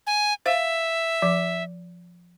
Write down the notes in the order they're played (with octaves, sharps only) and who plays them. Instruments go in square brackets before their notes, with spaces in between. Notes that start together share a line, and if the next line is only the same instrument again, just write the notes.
[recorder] G#5
[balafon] C5 F5 [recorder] E5
[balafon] F3